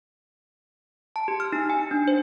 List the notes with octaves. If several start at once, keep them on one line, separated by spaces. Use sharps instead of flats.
A5
G4
F6
D#4
G#5
D4
C5